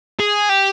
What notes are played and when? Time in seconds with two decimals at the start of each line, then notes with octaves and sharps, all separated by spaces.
0.19 G#4
0.49 G4